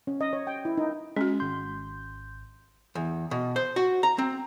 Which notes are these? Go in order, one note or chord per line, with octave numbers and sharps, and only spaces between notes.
C#4
D#5
C#5
G5
E4
D#4
G#3 C#4 F#4
G#1 C6 G6
E2
B2
C5
F#4
A#5
C4